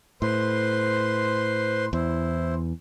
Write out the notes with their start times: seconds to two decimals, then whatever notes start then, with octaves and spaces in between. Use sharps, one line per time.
0.22 A2 B4 C5 C6
1.93 E2 E4 C5